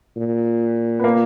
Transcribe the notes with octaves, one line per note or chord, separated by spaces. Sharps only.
A#2
B3
A#3